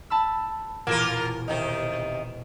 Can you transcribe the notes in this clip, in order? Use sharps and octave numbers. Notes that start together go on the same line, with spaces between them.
A5 B5 E6
E1 A#2 A#3 F4 A#4
C3 D#3 D#4